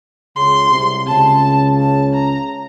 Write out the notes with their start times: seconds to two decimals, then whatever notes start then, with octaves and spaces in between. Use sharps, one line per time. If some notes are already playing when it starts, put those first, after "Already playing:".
0.36 C#2 C#3 C6
0.71 C2 C3
1.06 C#2 C#3 A5
1.78 A5
2.14 A#5